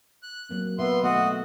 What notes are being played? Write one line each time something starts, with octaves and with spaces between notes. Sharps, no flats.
F#6
F#3 A#3 C4
B2 B3 E5 F5 C6
D#3 A3 B3 F#4 D#5 F#5